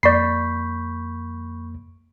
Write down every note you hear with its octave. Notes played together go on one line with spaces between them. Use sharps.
F2 A#3 D5 B5 C#6 G6 B6 C7